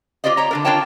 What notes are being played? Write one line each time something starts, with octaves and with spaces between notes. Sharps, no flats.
F4 G4 C5 D5 D#5
G4 C#5 A#5
D3 D4 A#4
D4 F4 A#4 C#5 G5 A5